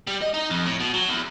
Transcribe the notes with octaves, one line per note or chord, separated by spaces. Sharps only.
G3
D#5
D#4
F2
A2
B2
F#3
E2